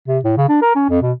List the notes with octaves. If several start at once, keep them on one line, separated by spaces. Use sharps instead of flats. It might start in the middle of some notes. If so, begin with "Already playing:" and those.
C3
A2
C#3
D4
A#4
C#4
F2
B2